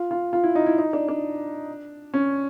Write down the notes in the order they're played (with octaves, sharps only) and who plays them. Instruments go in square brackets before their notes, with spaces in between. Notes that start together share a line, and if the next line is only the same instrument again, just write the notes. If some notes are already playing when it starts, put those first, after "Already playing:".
Already playing: [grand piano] F4
F4
F4
E4
D#4
E4
D#4
D4
D4
C#4